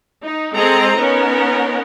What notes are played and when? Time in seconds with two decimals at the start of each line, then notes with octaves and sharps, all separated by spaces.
0.22 D#4
0.55 G#3 C4 G#4 A4 D#5 A#5
0.96 B3 C#4 D#4 A#4